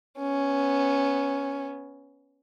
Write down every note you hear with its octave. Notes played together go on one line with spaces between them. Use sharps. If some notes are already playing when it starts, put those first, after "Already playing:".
B3 C#4